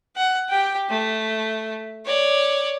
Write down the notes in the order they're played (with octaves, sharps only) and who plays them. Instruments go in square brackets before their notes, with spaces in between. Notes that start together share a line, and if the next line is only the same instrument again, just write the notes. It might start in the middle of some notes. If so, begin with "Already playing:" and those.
[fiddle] F#5
G4 G5
A3
C#5 D5